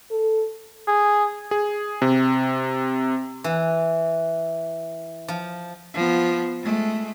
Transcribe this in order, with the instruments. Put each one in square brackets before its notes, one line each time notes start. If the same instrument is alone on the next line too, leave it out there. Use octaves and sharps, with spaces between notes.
[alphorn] A4
[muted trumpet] G#4
[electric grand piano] G#4
C3
[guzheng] E3
F3
[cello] F3 B3
G#3 A3